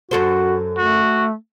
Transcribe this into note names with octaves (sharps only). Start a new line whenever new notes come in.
F#2 F#4 A4 C5
A3 F#4